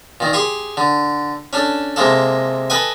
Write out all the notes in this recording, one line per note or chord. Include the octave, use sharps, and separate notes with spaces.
A#2 D#3
G4 G#4 C6
D3
C#4 D4 A4
C3 G#3 A#3 A4
A4 B4 D#5 G5 G#5